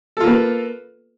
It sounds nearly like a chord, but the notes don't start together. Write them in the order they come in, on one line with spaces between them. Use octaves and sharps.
A4 F4 A#3 B4